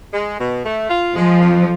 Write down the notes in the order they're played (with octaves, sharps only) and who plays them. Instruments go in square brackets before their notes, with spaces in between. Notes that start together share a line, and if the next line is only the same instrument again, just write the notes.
[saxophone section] G#3
B2
A3
F4
[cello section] F3 [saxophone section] G#3
[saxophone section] F2